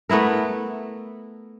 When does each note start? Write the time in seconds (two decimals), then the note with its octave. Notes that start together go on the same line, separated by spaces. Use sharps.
0.09 A3 B3 E4 A#4